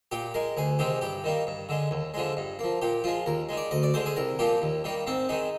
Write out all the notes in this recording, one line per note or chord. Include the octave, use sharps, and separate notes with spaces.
A#2 G4
G#3 A#4
D2 G#4
C3 D#3 G#3 G4
G2 G4
D#3 G3 A#3
G2
D3 G#3
D#2
D3 F3 G#3
G2
F3 A#3
A#2 G4
F3 G#3 F4
D#2 A#4
D#3 G#3
D5
D2 D#5
D5
D3 G#3 C5
G#4
C2 A#4
A#2 F3 A#3 G4
D#2
D#3 G3 A#3
G#2 C4
D#3 G#3 D#4